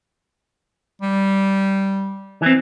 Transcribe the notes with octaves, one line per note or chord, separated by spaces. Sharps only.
G3
E3 C4